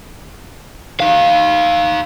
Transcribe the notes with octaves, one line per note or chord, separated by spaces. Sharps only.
D#4 F5